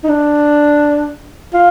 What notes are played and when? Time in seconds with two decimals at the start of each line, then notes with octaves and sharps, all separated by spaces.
0.04 D#4
0.08 D4
1.54 F4